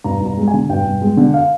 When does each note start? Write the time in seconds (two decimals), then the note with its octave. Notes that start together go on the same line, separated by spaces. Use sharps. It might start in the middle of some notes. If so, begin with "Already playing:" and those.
0.04 G2 A#5
0.20 G2
0.26 A#5
0.37 G#3
0.48 G#5
0.54 D3
0.69 G2 G5
0.85 G2
1.02 G#3
1.17 D3
1.34 F5